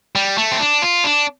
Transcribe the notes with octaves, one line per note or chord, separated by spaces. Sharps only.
G3
A3
C4
D4
F4
D4